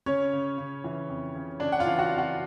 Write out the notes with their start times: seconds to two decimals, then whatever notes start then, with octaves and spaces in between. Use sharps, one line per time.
0.06 C#3 C#4 C#5
0.33 C#3
0.58 C#3
0.84 E3
1.09 F2
1.35 C#3
1.60 C#3 D4 D5
1.72 F#5
1.79 F4 F5
1.86 E3
1.99 F#4 F#5
2.11 F2
2.18 F#4 F#5